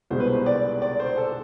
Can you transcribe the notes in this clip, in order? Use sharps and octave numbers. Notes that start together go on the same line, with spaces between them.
C2 B2 G#3 C5
B4
C5
D5
D5
C5
A4